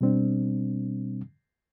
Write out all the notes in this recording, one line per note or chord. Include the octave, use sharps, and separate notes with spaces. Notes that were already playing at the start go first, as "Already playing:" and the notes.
B2 G3 C4 D4